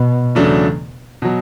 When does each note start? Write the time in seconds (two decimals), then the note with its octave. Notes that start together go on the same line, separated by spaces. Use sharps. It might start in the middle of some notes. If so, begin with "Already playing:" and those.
Already playing: B2
0.35 E2 C#3 F#3 A3 D4
1.22 B2 F#3